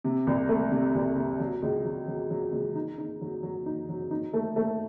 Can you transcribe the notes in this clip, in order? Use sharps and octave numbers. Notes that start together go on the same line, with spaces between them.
C3
C2
A3
C3
C2
C3
F#3
C#2
F#3
F#3
F#3
C#2
D#4
D#4
F#3
F#3
D#4
F#3
D#4
A3
A3